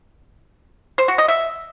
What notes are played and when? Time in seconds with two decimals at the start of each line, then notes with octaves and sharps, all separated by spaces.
0.98 C5
1.08 F#4
1.18 D#5
1.28 E5